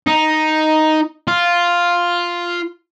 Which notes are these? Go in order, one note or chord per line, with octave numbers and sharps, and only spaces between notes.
D#4
F4